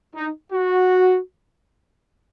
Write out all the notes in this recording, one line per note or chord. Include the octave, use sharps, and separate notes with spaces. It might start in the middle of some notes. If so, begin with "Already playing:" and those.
D#4
F#4